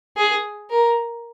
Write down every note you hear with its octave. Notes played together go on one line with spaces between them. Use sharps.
G#4
A#4